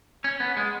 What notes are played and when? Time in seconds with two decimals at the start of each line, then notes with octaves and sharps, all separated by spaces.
0.24 C#4
0.40 B3
0.57 G#3